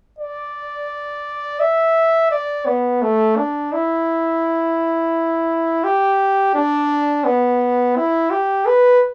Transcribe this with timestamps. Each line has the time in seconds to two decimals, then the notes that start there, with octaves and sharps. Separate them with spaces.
0.19 D5
1.60 E5
2.31 D5
2.66 B3
3.02 A3
3.37 D4
3.73 E4
5.84 G4
6.55 D4
7.24 B3
7.96 E4
8.31 G4
8.66 B4